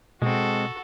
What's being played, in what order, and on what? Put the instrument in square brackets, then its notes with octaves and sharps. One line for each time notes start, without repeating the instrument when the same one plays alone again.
[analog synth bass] B2 [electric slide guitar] G#3 C4 [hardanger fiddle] F#4 A4